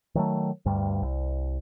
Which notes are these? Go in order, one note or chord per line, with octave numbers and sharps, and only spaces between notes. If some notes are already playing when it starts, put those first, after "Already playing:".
D#3 F#3 A3
D2 G2 G3
C2